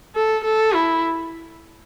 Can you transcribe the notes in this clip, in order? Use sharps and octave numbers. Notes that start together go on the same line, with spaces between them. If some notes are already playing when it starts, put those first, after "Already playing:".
A4
A4
E4